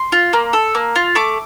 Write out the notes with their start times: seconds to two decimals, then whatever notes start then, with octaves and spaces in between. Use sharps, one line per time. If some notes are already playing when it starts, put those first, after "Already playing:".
Already playing: C6
0.12 F4
0.33 A#3
0.53 A4
0.75 A#3
0.96 F4
1.15 A3 D6